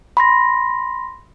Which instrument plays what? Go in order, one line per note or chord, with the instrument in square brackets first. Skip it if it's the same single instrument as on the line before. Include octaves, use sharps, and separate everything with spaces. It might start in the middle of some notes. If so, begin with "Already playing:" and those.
[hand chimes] B5 C6 A#6